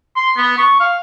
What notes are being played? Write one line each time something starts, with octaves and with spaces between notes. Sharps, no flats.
C6
B3
C#6
F5